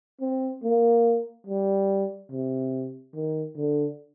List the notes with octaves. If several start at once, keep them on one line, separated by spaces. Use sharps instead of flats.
C4
A#3
G3
C3
D#3
D3